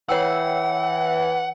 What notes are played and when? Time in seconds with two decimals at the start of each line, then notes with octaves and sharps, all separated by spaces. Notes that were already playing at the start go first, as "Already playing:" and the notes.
0.09 E3 C#5 F#5 G5 E6